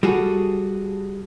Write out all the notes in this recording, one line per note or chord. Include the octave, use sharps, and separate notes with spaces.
G3 F#4 G#4 A4